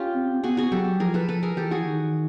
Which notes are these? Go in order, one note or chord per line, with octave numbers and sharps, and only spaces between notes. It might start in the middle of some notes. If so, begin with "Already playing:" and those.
Already playing: C#4 F4 G4
C4
B3 F#4 G#4
F#4 G#4
F#3 G4 A4
F3 G#4 A#4
A4 B4
F3 A4 B4
G#4 A#4
E3 G4 A4
F#4 G#4
D#3